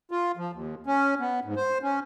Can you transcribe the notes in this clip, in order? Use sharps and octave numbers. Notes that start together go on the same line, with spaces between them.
F4
F3
D#2
C#4
B3
G#2
C5
C#4